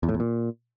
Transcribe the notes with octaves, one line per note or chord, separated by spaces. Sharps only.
E2
A2
E2
A#2